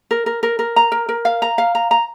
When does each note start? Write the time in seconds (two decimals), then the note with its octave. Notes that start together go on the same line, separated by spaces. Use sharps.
0.11 A#4
0.26 A#4
0.43 A#4
0.59 A#4
0.76 A#5
0.92 A#4
1.09 A#4
1.25 F5
1.42 A#5
1.58 F5
1.75 A#5
1.91 A#5